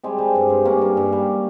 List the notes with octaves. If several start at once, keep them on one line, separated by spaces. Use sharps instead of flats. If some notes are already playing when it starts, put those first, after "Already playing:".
G3 G#3 C4
G3
G2
G2
G2 A#3 C#4
G2
G2
G3